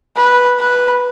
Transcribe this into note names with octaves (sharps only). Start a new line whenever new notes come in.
B4
B4